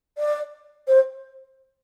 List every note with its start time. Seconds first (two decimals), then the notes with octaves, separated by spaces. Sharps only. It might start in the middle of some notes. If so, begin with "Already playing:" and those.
0.18 D5
0.88 C5